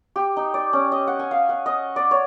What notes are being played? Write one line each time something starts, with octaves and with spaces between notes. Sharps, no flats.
G4
D#4
D5
C#4
D#5
F#5
G#5
F5
F#5
D#5
D5
C#5